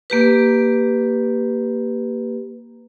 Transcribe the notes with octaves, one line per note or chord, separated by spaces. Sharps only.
A#3 G4 B4